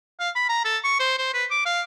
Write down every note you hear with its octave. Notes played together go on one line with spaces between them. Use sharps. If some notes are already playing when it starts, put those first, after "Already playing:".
F5
B5
A#5
A4
C#6
C5
C5
B4
D6
F5